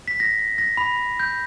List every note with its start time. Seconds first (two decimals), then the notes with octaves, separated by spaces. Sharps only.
0.08 B6
0.20 A#6
0.58 A#6
0.77 B5
1.20 G6